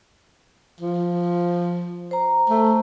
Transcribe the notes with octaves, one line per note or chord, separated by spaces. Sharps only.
F3
C5 A#5
A3